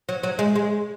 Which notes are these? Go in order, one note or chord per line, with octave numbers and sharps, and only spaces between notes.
F#3
F#3
G#3
G#3